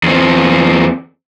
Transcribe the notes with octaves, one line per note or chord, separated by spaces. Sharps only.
E2 C4